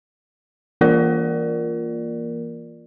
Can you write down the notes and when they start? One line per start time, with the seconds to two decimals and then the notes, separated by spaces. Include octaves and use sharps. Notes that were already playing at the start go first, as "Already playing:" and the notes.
0.81 E3 A#3 F4 A#4 D5